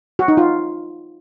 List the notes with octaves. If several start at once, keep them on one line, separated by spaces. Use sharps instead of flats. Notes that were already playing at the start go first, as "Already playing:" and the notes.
F#4
D#4
F4